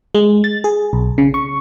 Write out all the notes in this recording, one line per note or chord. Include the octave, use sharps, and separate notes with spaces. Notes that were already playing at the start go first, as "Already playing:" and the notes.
G#3
A6
G#4
B1
C#3
C#6